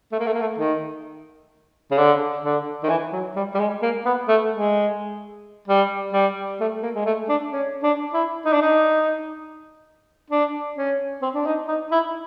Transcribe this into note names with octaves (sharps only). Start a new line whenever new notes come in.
A3
A#3
A3
A#3
A3
D#3
C#3
D3
D3
D#3
E3
F#3
G3
G3
G#3
A#3
B3
A3
G#3
G3
G3
A3
A#3
G#3
A3
D4
C#4
D4
E4
D#4
D4
D#4
D4
C#4
C4
D4
D#4
D#4
E4